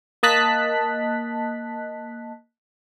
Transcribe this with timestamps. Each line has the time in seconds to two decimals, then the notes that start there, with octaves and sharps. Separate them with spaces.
0.23 A#3 D#5 A5 F#6 B6